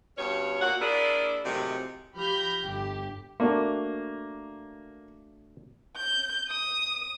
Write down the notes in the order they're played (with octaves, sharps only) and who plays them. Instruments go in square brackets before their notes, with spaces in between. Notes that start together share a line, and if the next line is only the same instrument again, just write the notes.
[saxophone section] G2 B2 C#4 C#5
A#2 A#3 F#4 F#5
A#3 D4 E4 G#4 A#4 D5
A2 C3 D#3 F3 F#3 G#3
[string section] F3 G4 B5 F6 G6 A#6
G1 G4
[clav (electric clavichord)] A3 D4 F#4 [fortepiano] A#3
[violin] G6
D#6